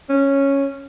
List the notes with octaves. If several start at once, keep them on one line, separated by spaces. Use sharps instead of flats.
C#4